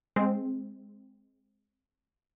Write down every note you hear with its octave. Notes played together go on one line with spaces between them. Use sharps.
G#3 C4